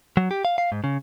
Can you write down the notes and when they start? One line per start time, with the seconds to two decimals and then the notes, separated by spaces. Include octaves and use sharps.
0.17 F#3
0.31 G4
0.45 F5
0.58 F5
0.72 G#2
0.84 C#3